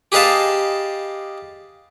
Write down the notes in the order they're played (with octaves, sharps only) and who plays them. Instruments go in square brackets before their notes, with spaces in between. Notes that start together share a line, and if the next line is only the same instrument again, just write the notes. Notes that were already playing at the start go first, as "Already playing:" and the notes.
[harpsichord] G4 G#4 B4 D#5 F5 A5